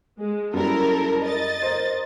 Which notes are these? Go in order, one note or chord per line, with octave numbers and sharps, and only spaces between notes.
G#3
F#2 G3 E4 A4 A#4
D#5 A6
A#4 C5